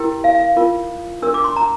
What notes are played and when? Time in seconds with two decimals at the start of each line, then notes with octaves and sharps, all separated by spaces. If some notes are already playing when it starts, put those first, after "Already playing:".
Already playing: E4 G4 A#4 G5
0.24 F5
0.35 F5
0.57 F4 A#4
1.22 D4 G4 A#4 E6
1.34 D6
1.44 C6
1.56 A#5